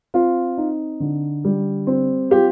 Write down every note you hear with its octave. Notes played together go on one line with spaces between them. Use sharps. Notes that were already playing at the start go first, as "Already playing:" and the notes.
C4 F4
D#4
D3
G3
C4
F4 G4